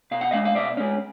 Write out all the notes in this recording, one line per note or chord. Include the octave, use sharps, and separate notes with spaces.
B2 F5
F#5
G#3 C#4 D#5 F5
F5
B2 D5 E5
G#3 C#4